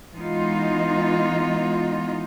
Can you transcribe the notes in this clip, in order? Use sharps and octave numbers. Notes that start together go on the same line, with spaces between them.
E3 G#3 B3 D#4 F4